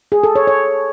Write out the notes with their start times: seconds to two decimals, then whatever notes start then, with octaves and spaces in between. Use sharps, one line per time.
0.12 G#4
0.24 A4
0.35 C#5
0.47 C#5